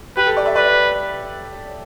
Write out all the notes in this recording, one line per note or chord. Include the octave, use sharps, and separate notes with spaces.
G4 B4
A4
D5
E5
B4 D5